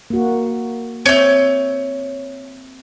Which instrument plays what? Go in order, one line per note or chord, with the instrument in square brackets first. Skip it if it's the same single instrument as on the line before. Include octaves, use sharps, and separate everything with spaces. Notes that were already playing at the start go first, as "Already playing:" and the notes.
[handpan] A#3 F#4
[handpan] C4 E5 [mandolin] C#5 G6